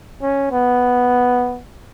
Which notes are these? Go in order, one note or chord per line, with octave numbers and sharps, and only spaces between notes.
C#4
B3